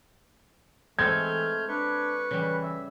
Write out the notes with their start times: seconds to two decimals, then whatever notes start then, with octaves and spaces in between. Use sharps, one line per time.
0.99 E3 G#3 A3 C4 A4 F6 G6 G#6
1.69 D4 B4 C#6
2.31 C#3 E3 G3
2.63 E5